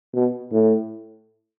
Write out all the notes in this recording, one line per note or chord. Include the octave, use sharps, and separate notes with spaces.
B2
A2